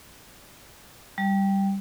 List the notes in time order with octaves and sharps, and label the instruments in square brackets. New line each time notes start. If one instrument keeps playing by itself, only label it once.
[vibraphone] G3